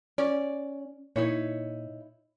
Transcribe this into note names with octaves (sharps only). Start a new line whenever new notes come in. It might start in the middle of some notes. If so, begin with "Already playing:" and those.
C#4 D5
A#2 D#4 E4 C#5